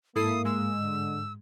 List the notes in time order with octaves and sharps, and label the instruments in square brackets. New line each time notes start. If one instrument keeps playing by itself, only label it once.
[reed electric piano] G#2 [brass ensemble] A#3 [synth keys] E4 A4 C7 [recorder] D#6
[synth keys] G#3 [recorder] E6
[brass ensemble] D3